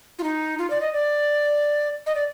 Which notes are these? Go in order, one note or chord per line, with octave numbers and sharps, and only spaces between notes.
F4
D#4
F4
D5
D#5
D5
D#5
D5